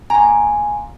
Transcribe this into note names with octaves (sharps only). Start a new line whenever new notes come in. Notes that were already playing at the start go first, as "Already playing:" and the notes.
A#2 G#5 A#5